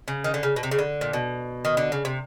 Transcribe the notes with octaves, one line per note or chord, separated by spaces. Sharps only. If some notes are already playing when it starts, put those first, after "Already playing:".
C#3
D#3
D3
C#3
B2
C3
C#3
D3
A#2
B2
D#3
D3
C#3
C3